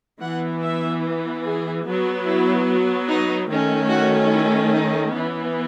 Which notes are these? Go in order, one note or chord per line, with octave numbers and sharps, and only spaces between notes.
E3 B3 F#5
E5
G#4
F#3 B3
E4
D#4
D#3 A3 C#4
F#4
E4
D#4
E3 B3